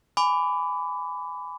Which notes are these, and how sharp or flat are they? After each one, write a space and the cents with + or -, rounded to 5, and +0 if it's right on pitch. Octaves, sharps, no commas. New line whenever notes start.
G#5 +0 B5 +20 D6 -15